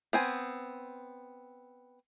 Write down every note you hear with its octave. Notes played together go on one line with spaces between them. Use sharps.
B3 C4 G#5